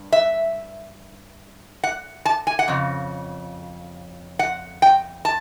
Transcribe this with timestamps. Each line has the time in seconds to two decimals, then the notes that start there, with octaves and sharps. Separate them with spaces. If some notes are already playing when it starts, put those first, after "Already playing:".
Already playing: G2
0.12 E5
1.84 F#5
2.25 A5
2.47 G#5
2.59 F#5
2.68 F2 C#3
4.39 F#5
4.82 G5
5.25 A5